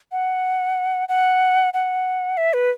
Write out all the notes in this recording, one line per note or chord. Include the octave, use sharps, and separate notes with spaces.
F#5
F#5
F#5
E5
B4